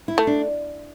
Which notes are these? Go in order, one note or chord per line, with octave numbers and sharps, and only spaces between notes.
E4
A3
D4